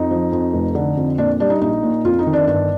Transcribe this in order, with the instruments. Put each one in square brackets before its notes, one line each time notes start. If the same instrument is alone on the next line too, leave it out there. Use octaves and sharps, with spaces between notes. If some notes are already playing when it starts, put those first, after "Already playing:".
Already playing: [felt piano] F2 D#4
F3
F2
F1
D3
F2
A#2 D4
G3 D4
D#4
A#1 D#4
A#2
F2 F4
D#4
D#3
D4
G1 D4